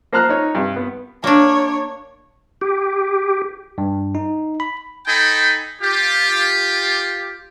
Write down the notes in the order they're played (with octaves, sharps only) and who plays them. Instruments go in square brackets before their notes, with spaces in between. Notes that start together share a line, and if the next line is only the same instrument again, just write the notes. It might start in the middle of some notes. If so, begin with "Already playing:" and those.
[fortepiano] A#3 C5 A5 A#5 F6 F#6
D#4 C#5
G2 C3
B3
[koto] A#3 D4 [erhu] C#5
[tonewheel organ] G4
[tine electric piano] G2
D#4
B5
[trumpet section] D#4 A4 G5 G#5 B5
F4 G4